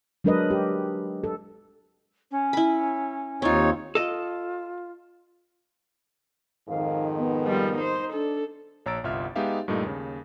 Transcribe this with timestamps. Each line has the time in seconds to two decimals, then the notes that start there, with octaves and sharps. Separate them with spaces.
0.24 F#3 G#3 D4 A#4 B4 D#5
0.50 G4
1.24 A4
2.31 C#4
2.53 E4 B5
3.42 D#2 C4 D#4 F4 C#5
3.95 F4 A4 D#5
6.69 F2 G#2 D#3 F5
7.17 B3
7.47 F3 G3
7.78 D#4 C5
8.13 D4 A4
8.86 A#1 C#5 A#5 E6 A6 D7
9.04 G1 C2 F4 E5 F6
9.36 G#3 B3 D#4 G4 E5 F5
9.68 G2 A#2 G3 A3 D#4
9.82 D#2 C#3